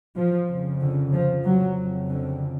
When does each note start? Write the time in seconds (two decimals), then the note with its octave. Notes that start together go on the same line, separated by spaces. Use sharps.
0.16 F3
0.49 F2 C#3
0.81 D3
1.13 F3
1.45 F#3
1.78 F2 C#3
2.09 D3